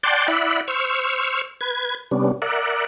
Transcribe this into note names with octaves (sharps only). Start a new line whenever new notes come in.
D5 F#5 G5 A5 C6
E4 D5 E5 F#5 B5
C5 C#6 E6 F6
B4 G#6
C3 G3 B3 C#4 D4
A#4 D5 E5 F#5